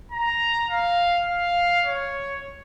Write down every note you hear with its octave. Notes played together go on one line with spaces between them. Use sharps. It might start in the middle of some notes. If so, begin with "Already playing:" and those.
A#5
F5
F5
C#5